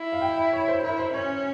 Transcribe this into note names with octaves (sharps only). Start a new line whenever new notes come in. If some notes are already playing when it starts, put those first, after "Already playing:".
Already playing: E4
F5
G5
E5
C#5
C5
E4 A#4
C5
C#4 C#5